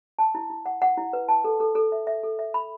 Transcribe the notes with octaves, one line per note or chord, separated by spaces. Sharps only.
A5
E4
E4
F#5
F#5
E4
B4
A5
A4
A4
A4
E5
E5
A4
E5
B5